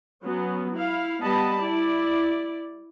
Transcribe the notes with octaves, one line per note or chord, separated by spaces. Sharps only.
F#3 B3 C#4
E4 F5
G3 B3 D#5 A5 B5
E4 D5